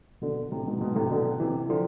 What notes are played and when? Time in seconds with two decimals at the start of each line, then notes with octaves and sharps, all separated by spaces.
0.21 B2 D3
0.52 A2 C3
0.66 G#2 B2
0.81 G#2 B2
0.95 A2 C3
1.11 B2 D3
1.40 C3 E3
1.69 D3 F3